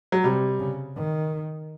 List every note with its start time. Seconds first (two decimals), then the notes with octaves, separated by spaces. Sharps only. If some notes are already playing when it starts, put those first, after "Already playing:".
0.12 F#3
0.24 C3 G3
0.60 C#3
0.96 D#3